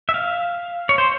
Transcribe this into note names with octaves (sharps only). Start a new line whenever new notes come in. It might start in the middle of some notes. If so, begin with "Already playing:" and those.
E5
F5
C#5
C5